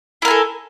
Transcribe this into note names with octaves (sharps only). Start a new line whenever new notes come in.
E4 A4 A#4 G#5